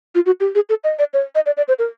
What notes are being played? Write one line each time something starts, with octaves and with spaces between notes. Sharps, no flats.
F4
F#4
G4
G#4
A4
D#5
D5
C#5
D#5
D5
D5
C5
A#4